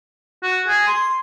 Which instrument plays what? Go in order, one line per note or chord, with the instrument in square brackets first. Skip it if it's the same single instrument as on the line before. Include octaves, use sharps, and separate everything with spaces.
[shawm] F#4
G#4
C6